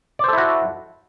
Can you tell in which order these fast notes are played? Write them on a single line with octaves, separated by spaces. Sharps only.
D5 C5 A4 E4 F#4